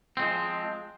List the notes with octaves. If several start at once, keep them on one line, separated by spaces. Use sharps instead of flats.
F3 G#3 C4